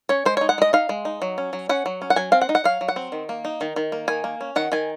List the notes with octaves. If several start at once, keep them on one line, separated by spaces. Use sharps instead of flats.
C#4 C#5
G#3 C5
D#4 C#5
F#5
G#3 D#5
D#4 F5
G#3
D#4
F#3
C#4
F#3
C#4 F#5
F#3
C#4
F#5
F#3 G#5
C4 F5
F#5
D#4
F#5
F#3 F5
F#3
F#5
C4
D#3
A#3
D#4
D#3
D#3
A#3
D#3 G#5
A#3
C#4
D#3 F#5
D#3 G#5